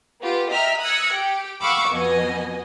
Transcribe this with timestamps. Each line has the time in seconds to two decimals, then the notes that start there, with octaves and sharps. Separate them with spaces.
0.21 B3 F4 G4
0.51 D#5 E5 G5 A#5 F6 B6
0.81 D#6 E6 F#6 G#6 A#6 C#7
1.14 G4 G5
1.61 F5 F#5 B5 C#6 D6 E6
1.93 F2 B2 B3 D#5 G#5